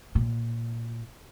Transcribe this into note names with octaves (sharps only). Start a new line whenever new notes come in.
A#2